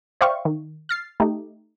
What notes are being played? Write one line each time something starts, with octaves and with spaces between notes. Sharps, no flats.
C5 D5 E5 F5 G5 C#6
D#3
F6 A6 C7
A3 D#4 G4